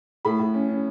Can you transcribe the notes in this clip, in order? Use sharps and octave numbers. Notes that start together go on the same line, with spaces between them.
A2 B5
A2
C#4
C#4